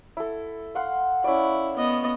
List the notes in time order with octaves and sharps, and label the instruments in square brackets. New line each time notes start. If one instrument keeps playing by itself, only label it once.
[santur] E4 A4
F5 F#5 C6
[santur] C#4 D5 [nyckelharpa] E4
[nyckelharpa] B3 D#5